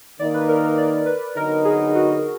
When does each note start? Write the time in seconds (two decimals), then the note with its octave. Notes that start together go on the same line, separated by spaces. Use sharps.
0.19 D#3 A#3 D#4 D5
0.34 B4
0.49 A#4
0.63 A#4
0.78 D5
1.06 B4
1.36 D3 F#3 B3 D#4 A#4
1.65 G#4
1.95 F#4